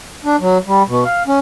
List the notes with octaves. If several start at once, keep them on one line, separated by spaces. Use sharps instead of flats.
D4
F#3
G3
B2
F5
C#4